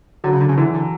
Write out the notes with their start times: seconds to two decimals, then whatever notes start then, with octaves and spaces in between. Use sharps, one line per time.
0.24 D3 F#3
0.33 C#3
0.41 D3
0.49 C#3
0.57 D3 E3
0.74 D3